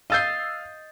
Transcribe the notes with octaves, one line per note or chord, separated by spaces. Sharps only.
D#5 F5 E6 G6 A6 C7